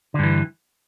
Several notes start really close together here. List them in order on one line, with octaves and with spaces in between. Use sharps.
D3 G2 E3